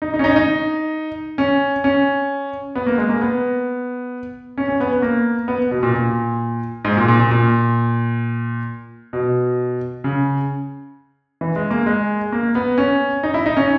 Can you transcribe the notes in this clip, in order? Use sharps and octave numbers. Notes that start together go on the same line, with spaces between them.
D#4
D#4
C#4
D#4
D#4
C#4
C#4
B3
A#3
G#3
A#3
B3
C#4
C#4
B3
B3
A#3
B3
B2
A#2
A#2
G#2
A#2
A#2
A#2
A#2
B2
C#3
E3
G#3
A#3
G#3
A#3
B3
C#4
D#4
E4
D#4
C#4